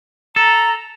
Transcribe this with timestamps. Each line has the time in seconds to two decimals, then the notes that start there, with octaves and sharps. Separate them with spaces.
0.36 A4 A#5